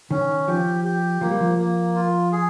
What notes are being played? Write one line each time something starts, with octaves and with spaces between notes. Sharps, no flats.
D#3 C#4
F3 G4
G4
F3 A#3
G3
F3
A#3
F4
G#4